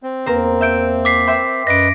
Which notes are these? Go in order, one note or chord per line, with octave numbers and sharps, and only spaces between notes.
C4
E2 A#3 A#4 C5
E5 G6 D7
D6 B6 C7
E5 G5 C6
F#2 B4 D#5 A#6 D7